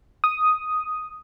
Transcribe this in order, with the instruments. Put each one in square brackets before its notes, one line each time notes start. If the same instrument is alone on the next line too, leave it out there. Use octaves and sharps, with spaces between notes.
[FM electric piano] D#6